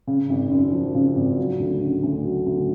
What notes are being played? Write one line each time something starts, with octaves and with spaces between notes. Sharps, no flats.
C#3
G#1
F#2
F3
C#3
G#1
F#3
D2
C#3
D2
F#3
D2